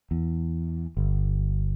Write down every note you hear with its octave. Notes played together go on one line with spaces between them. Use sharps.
E2
G1